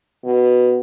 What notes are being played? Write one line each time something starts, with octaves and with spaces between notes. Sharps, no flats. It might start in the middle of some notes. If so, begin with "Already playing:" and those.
B2